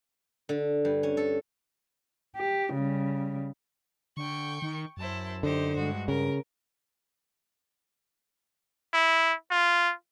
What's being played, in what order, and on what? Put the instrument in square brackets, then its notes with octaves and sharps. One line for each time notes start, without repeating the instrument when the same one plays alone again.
[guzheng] D3
G2
C#4
A4
[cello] G4
C#3 G3
[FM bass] D3 [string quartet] G5 C#6
[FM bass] D#3
[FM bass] F#2 [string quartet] E4 C5 A5
[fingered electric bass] D3 [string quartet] D#4 G4 C5
[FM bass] G2 [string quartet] G#3 F#4
[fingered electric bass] C#3 [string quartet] A#4
[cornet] E4
F4